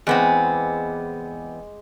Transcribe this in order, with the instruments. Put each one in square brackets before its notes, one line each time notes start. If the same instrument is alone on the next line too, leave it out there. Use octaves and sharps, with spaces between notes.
[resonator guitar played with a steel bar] E2 B3 C4 [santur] G#3 D6